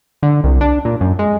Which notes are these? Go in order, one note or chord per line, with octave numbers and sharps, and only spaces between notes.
D3
C2
D4
A#2
F#2
G#3